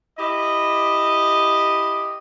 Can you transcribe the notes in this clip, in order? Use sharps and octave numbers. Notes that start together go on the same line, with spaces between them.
E4 G4 D#5